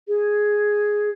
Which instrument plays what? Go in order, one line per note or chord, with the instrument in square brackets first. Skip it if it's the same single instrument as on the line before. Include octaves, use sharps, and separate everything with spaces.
[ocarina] G#4